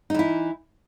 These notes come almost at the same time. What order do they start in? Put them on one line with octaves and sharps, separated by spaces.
D#4 E3 E4